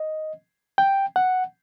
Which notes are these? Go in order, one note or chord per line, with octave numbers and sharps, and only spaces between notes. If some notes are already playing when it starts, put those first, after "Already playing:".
Already playing: D#5
G5
F#5